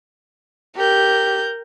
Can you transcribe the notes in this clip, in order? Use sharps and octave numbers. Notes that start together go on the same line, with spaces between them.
G4 A#4 G6